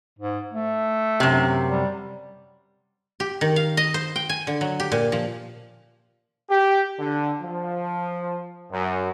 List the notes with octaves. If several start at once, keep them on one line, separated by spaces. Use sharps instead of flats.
G#2
A3
F#2 C3
G3
G4
D#3
F5
D#5
C5
G5
G#5
D3
F#3
G4
A#2
F3
G4
D3
F3
F#2